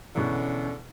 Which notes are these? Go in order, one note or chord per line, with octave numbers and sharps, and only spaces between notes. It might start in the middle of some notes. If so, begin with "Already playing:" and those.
E2 B2 D3 C#4 E4 F#6